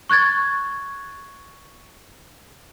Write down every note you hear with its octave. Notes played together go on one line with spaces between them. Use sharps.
C#6 F#6 G#6 A6